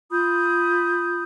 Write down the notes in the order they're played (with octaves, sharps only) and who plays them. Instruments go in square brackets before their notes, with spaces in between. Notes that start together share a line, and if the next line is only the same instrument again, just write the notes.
[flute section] F4 B5 D#6 G6